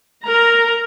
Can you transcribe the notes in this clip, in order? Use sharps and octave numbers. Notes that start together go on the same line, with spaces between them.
A#4 A#5